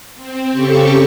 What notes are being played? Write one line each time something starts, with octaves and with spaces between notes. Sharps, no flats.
C4
C#3 C4 G4 A4 C#6